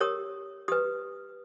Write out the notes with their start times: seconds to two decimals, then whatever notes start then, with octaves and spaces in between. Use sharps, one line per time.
0.01 G4 A#4 C#5 D#6
0.68 G4 B4 D#6